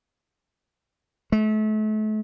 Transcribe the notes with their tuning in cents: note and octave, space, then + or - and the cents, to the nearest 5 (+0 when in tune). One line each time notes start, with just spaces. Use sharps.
A3 -35